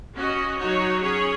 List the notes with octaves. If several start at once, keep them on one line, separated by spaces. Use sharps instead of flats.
C#4 F#4 D#5
F#3 D#4 F#4 C#5
C#4 G#4 C#5